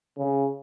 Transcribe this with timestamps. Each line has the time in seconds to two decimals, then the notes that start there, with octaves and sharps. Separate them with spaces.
0.18 C#3